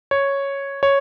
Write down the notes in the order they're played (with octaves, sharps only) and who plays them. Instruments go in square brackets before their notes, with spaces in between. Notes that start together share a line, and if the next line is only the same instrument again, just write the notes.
[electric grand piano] C#5
C#5